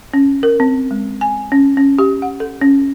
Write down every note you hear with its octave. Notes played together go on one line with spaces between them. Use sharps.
C#4
A#4
C4
G#3
G#5
C#4
C#4
G4
F#5
A4
C#4